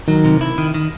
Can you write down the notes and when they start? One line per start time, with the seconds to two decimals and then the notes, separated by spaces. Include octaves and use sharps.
0.08 D#3 F#3
0.25 C3
0.41 E4
0.58 D#3
0.74 D#3